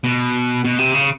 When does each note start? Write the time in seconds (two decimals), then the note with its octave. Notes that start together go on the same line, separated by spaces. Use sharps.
0.04 B2
0.65 B2
0.79 C3
0.94 C#3